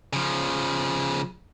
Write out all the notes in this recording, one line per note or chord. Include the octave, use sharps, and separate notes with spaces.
C#3 F3